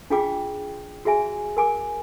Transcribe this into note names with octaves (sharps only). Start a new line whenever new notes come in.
D4 F4 G#4 F5 G5 D6
F#4 G#4 E5 G#5
A#4 G#5 D6